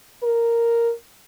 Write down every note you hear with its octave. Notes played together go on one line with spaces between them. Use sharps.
A#4